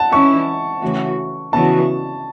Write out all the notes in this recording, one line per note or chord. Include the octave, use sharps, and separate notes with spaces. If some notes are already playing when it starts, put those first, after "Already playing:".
Already playing: F#5 A5
E3 C#4 E4 C#6
C#3 E3 A3 F#4
C#3 E3 B3 F#4 A5